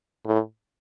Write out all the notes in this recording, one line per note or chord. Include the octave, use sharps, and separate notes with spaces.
A2